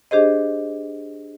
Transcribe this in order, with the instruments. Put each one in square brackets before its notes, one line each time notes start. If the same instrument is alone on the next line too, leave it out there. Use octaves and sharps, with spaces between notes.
[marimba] D4 G4 G#4 C5 D#5